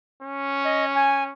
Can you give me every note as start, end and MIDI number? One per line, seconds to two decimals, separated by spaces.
0.22 1.33 61
0.65 0.85 75
0.95 1.23 80